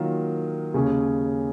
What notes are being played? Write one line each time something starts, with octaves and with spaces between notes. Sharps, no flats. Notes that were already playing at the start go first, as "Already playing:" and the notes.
Already playing: D#3 F#3 A#3 F4
D#2 C#3 G#3 C#4 G#4